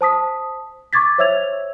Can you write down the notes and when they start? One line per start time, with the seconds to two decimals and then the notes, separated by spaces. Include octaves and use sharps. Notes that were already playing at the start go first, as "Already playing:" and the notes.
0.01 C5 A5 D#6 B6
0.93 C#6 D6 G#6 A6 B6
1.18 C5 C#5 E5 E6 G#6 F7